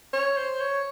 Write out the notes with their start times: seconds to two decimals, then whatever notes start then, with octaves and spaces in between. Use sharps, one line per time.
0.13 C#5
0.37 C5
0.61 C#5